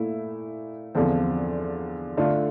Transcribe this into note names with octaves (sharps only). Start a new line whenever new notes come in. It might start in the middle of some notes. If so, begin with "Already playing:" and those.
Already playing: A#2 A3 E4
E2 D3 F3 C4
D3 A3 D4 F4